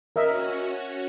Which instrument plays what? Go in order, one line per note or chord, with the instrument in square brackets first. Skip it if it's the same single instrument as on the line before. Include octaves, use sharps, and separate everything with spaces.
[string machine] C#4 F#4 [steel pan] A#4 D#5 E5